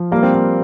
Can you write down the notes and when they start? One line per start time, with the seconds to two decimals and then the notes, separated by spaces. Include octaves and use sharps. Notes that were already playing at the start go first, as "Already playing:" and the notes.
Already playing: F3
0.12 G3 A#3
0.23 C4
0.35 A#3